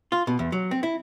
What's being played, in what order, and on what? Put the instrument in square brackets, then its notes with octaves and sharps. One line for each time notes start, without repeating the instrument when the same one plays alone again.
[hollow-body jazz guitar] F4
B2
E2
F#3
C4
E4